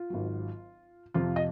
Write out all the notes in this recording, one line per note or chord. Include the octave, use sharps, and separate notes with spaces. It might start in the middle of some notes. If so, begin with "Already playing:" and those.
Already playing: F4
G#1 G#2 F#3
F2 C3 F3 F4
D#5